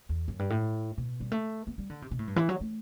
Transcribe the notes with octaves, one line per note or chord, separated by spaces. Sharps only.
E2
F#2
G2
A2
B2
G3
A3
B3
G3
D3
C3
B2
A2
G2
E3
F#3
A3